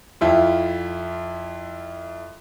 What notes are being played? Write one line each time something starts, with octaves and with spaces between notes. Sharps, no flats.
F2 E4 F4